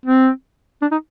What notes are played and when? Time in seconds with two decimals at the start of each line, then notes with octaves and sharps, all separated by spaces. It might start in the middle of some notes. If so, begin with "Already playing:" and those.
0.06 C4
0.82 D4
0.92 D#4